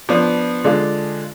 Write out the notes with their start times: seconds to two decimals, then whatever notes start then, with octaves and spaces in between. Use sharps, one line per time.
0.09 F3 B3 D4
0.64 D3 G#3 D4 F4